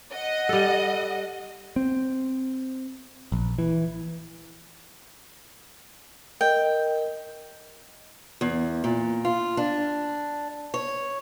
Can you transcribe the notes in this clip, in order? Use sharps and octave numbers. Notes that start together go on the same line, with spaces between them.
D#5 F#5
G3 A4
C4
A#1
E3
A#4 D#5 G5
E2
A#2
F4
D4
C#5